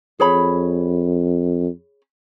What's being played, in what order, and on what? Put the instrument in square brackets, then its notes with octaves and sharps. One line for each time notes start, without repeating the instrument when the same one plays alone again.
[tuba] F2 [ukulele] G#4 C#5 B5